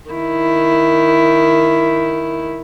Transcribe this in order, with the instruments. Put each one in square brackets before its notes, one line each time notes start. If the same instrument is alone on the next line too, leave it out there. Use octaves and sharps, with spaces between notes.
[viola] D#3 E4